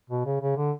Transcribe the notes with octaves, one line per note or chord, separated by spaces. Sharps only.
B2
C#3
C#3
D3